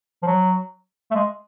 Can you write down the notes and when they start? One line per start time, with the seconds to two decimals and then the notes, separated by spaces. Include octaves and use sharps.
0.23 F3
0.27 F#3
1.11 A3
1.15 G#3